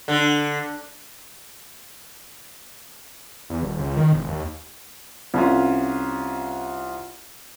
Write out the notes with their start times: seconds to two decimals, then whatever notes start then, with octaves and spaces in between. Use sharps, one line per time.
0.08 D3
3.50 E2
3.63 D#1
3.79 C#2
3.97 D#3
4.13 E1
4.28 D#2
5.34 C2 C#4 F4